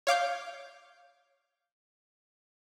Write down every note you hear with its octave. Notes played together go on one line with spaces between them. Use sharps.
C#5 F5 D6 G6